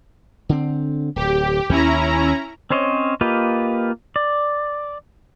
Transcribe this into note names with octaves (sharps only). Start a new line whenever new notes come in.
D3 C4
D1 G4
D#2 C#4 E4 A#5
C4 C#4 C5 C#5 D#5
A#3 F4 G4 B4 D#5
D5